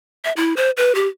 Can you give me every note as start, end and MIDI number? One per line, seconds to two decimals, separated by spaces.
0.25 0.32 76
0.37 0.54 64
0.57 0.71 72
0.77 0.94 71
0.95 1.07 67